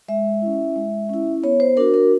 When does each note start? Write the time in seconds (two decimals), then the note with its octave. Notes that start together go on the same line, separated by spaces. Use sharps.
0.08 G#3 E5
0.42 C#4 E4
0.76 G#3
1.09 C#4 E4
1.43 B3 C#5
1.60 C5
1.77 D4 F#4 A#4
1.94 A#4